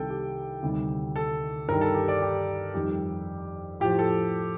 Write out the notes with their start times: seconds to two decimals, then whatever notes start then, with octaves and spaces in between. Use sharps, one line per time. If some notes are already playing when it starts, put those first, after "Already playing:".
Already playing: C2 C3 D#3 G3 A4 G5
0.10 G4
0.63 D2 C3 D#3 G3
1.16 A4
1.68 G2 D#3 G3 A#4
1.81 A4
1.94 G4
2.08 D5
2.22 G4
2.74 F2 D#3 G3 G4
3.80 A2 F3 G4
3.99 A4